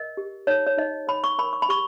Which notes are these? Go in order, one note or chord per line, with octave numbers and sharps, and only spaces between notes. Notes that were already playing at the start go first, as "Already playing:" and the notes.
Already playing: A#4 D#5
G4
D#4 C#5
C#5
D#4 D#5
C#5 B5
C#6
A#4 B5
C#6
B5
G4 C#6